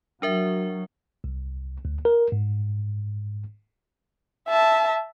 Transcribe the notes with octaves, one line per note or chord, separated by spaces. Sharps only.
F#3 D4 A#4 E5
C2
D2
A#4
G#2
E5 A5